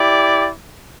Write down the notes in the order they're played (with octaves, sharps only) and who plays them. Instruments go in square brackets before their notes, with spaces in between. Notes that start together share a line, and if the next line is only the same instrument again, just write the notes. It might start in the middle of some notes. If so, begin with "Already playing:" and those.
Already playing: [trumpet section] E4 G4 D5